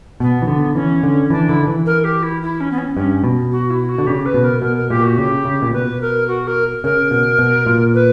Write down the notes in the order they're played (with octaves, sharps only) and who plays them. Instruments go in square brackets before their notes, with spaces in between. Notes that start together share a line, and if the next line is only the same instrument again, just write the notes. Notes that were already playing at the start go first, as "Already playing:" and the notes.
[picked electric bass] B2 [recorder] B3
[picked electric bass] E3
D3
[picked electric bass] E3 [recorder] C#4
[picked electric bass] D3
[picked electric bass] E3 [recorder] D4
[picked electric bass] D3 [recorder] E4
[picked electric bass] D3
E3
[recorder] A#4
G4
E4
E4
C#4
B3
C#4
[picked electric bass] G2 [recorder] C#4
[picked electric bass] B2
[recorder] F#4
E4
F#4
[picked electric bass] D3
[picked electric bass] C#3 [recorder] G4
[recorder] B4
[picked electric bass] B2
[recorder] A#4
[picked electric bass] B2 [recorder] A#4
[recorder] A#4
[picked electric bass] A#2 [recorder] G4
[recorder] F#4
[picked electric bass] C#3 [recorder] G4
[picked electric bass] C#3
A#2
[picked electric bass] B2 [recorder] B4
[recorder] A#4
F#4
A#4
[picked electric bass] C#3 [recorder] A#4
[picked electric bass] B2
B2
A#2
[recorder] B4